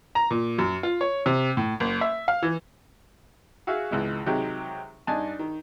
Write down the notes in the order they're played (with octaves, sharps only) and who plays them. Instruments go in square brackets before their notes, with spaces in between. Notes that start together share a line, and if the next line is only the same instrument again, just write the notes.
[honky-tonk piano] A#5
A#2
F#2
F4
C#5
C3
A2
F#1
E5
F5
E3
[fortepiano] F#4 G#4 E5 F5
G#1 C#2 E3 G#3
C3 D#3 F#3 G#3 G4
G2 D4 D#4 G#5 A5
D#3